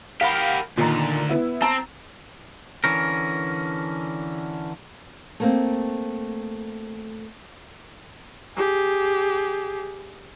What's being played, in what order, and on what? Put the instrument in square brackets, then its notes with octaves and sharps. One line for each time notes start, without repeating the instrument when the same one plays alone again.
[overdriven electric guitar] G4 A#4 [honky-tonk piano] F5 F#5 B5
[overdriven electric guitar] D2 [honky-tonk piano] A#2 D#3 A#5
[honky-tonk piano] B3 E4
[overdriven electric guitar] C4 [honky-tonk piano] A5 A#5
[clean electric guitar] D3 E3 C#4 A#4
[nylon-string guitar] A3 A#3 C4
[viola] G4 G#4